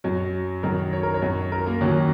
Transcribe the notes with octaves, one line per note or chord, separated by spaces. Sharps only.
F#2 F#3
F#2 D#3 F#3 A#4
C#5
A#4
C#5
F#2 F#3
A#4
A#3
D#2 D#3 F#3 C#4